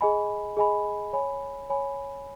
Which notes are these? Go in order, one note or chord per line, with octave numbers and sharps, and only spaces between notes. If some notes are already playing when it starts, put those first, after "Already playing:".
G#4 D#5 G#5 B5
G#4 D#5 G#5 B5
C#5 G#5 B5
C#5 G#5 B5